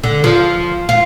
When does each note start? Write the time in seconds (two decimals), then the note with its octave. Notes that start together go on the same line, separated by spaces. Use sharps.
0.04 D3
0.24 F3
0.89 F4